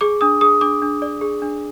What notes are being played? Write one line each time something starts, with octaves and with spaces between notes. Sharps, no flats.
G#4 D6
D4 D#6
G#4 D#6
D4 D6
D4
D5
G#4
D4